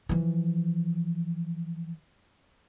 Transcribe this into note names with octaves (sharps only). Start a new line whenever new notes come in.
E3 F3